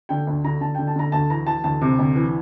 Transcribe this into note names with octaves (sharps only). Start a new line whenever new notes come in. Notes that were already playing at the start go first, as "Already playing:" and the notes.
D3 G5
D2
D3 A#5
D3 A5
D3 G5
A5
D3 A#5
D2 A5
E3 A#5
E3 A5
D2 A5
C3
D2
E3